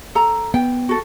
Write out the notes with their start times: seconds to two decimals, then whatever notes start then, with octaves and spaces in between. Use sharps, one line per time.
0.15 A4 A#5
0.54 B3 G5
0.89 F#4 A4